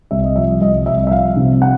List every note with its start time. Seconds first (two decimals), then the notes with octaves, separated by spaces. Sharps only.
0.11 C2 E5
0.24 D#5
0.36 F3 E5
0.61 C2 D#5
0.86 C2 E5
1.07 E5
1.11 F3 F5
1.36 C3
1.62 F#5